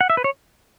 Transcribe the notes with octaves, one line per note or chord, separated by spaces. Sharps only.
F#5
E5
B4
C#5